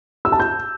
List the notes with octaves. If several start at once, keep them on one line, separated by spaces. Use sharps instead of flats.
E6
A5
G6